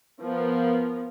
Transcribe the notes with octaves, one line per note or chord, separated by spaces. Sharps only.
F3 B3 A#4